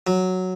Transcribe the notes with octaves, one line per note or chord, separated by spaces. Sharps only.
F#3